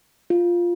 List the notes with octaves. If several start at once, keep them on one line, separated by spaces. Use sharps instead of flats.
F4